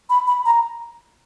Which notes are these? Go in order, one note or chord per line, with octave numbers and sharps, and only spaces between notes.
B5
B5
A#5